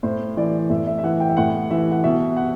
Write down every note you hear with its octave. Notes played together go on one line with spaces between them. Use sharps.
A2 C5
E3 D5
A2 E5
E5
E5
E3 F#5
G5
E5
A2 F#5
E3 E5
F#5
B2 E5
F#5